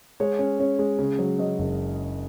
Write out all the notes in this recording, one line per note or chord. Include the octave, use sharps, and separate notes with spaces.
G#3 C#5
C#4
C#4
G#3
C#3
F#3
F#3 D#5
F#1